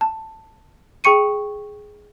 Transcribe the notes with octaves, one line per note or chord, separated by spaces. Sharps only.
A5
G#4 G5 C#6 C#7 D#7